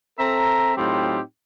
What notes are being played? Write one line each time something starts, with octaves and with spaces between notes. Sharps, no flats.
C4 A4 E5 A#5
A2 F#3 C4 D#4 F4 G4